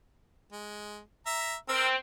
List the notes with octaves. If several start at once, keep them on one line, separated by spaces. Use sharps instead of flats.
G#3
E5 A#5
C4 A#4 E6